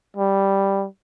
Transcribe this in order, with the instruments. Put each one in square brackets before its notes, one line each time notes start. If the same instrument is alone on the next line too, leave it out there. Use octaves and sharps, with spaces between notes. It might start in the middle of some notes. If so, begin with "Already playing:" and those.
[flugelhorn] G3